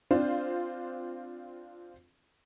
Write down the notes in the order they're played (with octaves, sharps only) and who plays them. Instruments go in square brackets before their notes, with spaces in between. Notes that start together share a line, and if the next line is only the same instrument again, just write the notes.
[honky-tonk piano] C4 D4 F4 C5